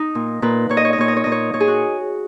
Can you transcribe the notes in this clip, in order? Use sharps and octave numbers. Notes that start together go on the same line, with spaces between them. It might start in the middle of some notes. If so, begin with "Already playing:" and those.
Already playing: D#4
A#2
A#2 B4
A#2 C#5
D#5
C#5
D#5
A#2 C#5
D#5
C#5
A#2 D#5
C#5
A#2 C#5
G#4
F#4